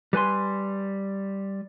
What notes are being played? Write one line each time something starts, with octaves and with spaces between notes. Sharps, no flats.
G3 B4 G#5 C6